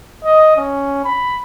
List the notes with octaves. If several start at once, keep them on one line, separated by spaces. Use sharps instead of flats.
D#5
C#4
B5